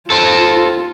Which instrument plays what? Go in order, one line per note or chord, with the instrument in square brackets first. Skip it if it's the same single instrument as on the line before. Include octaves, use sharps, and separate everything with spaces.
[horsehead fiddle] F4 [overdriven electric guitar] A4 C5